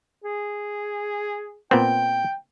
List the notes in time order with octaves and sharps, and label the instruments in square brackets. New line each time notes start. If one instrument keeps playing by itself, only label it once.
[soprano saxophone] G#4
[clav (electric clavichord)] A#2 B3 C4 [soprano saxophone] G5